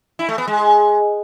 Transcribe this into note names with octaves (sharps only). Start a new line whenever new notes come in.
E4
A3
B3
G#3